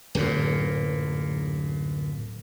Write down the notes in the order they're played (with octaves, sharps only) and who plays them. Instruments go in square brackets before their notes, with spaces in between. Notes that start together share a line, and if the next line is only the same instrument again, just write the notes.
[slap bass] D1 F#2 A#2